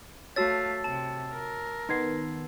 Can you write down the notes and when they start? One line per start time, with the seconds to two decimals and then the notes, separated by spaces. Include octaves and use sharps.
0.36 A3 F#4 C#5 F5 A5 E6 A6
0.84 C3 A5
1.32 A#4
1.89 D#3 B3 C6 G#6 C7